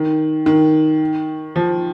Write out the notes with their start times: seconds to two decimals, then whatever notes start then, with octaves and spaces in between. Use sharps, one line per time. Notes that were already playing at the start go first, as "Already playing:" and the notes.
Already playing: D#3
0.46 D#3
1.56 F3